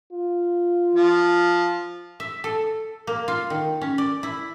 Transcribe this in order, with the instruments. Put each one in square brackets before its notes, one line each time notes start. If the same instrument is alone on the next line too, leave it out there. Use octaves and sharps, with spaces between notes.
[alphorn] F4
[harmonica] F3
[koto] E5
A4
A#3
F4
D#3
C#4
D5
E4